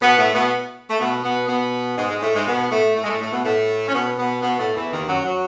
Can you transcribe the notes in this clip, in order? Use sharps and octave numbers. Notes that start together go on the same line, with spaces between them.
B2 B3
A2 A3
B2 B3
A3
B2 B3
B2 B3
B2 B3
G#2 G#3
G#2 G#3
A2 A3
G#2 G#3
B2 B3
A2 A3
A2 A3
G#3
A2 A3
A2 A3
B2 B3
A2 A3
C#4
B2 B3
B2 B3
B2 B3
A2 A3
E2 E3
D#2 D#3
F#2 F#3
F#3